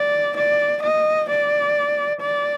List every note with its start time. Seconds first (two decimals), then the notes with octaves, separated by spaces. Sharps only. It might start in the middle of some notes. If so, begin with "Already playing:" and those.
Already playing: D5
0.37 D5
0.83 D#5
1.30 D5
2.21 D5